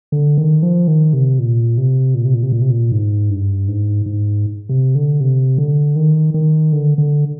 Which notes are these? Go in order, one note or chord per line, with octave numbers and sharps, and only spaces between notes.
D3
D#3
F3
D#3
C3
A#2
C3
A#2
C3
A#2
C3
A#2
C3
A#2
G#2
G2
G#2
G#2
C3
D3
C3
D3
D#3
D#3
D3
D3